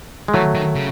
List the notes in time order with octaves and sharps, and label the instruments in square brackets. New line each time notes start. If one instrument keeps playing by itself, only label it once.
[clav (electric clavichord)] G#3
[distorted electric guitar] E3 [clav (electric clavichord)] F#3 A3
[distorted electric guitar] D#3
C#3